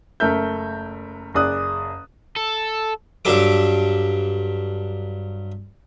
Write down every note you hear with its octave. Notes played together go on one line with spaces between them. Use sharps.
F#1 A3 A#4 E5 G6
F#1 G#4 D5 D#6 F#6
A4
G2 F#3 A4 D6